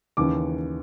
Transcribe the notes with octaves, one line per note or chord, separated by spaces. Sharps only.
D#2 C#3 E3 D6